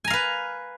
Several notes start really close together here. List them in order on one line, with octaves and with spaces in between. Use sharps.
G#5 A#5 F5 B4